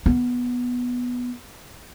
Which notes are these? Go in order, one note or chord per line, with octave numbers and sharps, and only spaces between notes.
B3